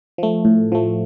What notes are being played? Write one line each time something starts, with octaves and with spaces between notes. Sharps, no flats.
F3 A3
A2
F3 A3